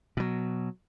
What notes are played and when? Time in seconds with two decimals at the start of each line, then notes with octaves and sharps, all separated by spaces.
0.17 B2 F#3